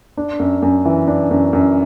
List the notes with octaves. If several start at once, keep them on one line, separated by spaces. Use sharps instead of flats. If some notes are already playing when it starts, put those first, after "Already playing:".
D4
F#2
F#2
E3
D4
F#2
F#2